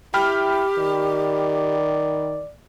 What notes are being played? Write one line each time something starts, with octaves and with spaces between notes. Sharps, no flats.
E4 G4 G5 B5 F6
D#3 D5